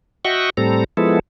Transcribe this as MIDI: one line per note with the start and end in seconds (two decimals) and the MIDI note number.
0.25 0.50 66
0.25 0.50 75
0.25 0.50 76
0.25 0.50 78
0.25 0.50 79
0.25 0.50 85
0.57 0.84 45
0.57 0.84 55
0.57 0.84 60
0.57 0.84 69
0.57 0.84 82
0.97 1.19 53
0.97 1.19 56
0.97 1.19 59
0.97 1.19 64
0.97 1.19 69